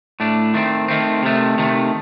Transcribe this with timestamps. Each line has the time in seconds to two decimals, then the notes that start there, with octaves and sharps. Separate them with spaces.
0.20 A2 A3 D4
0.54 D#3 A3 C4
0.88 D#3 A3 C4
1.23 C3 D#3 A3
1.58 C3 D#3 A3